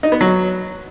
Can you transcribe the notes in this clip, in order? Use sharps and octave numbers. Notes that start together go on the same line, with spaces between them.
D#4
B3
F#3